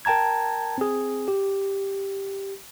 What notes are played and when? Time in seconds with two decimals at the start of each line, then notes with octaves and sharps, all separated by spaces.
0.05 A#4 G5 A5 A#5 G#6
0.78 C4 G#4
1.28 G4